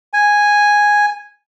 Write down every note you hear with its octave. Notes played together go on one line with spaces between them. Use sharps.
G#5